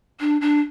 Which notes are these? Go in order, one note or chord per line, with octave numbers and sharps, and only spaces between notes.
D4
D4